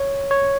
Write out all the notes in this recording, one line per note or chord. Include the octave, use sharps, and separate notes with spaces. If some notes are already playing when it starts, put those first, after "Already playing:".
Already playing: C#5
C#5